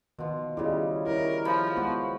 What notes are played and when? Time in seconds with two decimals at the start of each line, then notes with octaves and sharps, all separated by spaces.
0.19 B2 D#3 F3
0.57 C#3 G3 E4 G#4 D#5
1.06 E4 F4 A#4 C#5
1.46 F3 B5
1.77 G#3 B3 F#4